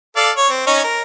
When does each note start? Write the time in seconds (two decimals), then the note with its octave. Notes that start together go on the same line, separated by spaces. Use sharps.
0.16 A4 D5 F5
0.36 C#5
0.50 C4
0.67 C#4 D#4 C#5
0.84 A#4